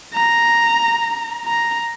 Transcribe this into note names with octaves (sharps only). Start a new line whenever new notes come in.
A#5
A#5